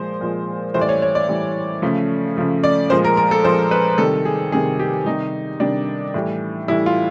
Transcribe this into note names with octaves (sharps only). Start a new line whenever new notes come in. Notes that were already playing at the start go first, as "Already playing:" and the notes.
Already playing: A#2 F3 G#3 C5
A#2 F3 G#3
A2 E3 G3 C5
D5
C#5
C#5
D5
A2 E3 G3
C#3 F3 A3
C#3 F3 A3
D5
A#2 F3 G#3 C5
A#4
A#4
A4
A#2 F3 G#3 C5
B4
C3 D#3 G3 A4
G#4
C3 D#3 G3 G#4
G4
C3 D#3 G3 D#4
C3 D#3 G3 D4
A2 E3 G3
A2 E3 G3 E4
F4